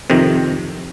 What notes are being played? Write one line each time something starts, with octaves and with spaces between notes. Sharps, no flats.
F2 C3 D#3